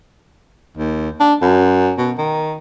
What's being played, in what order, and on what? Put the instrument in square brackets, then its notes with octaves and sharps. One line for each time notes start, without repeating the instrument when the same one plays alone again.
[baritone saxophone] D#2
D4
F#2
B2
D#3